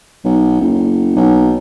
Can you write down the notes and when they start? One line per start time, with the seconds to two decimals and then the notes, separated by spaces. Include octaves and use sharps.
0.24 B1
0.61 F#1
1.16 B1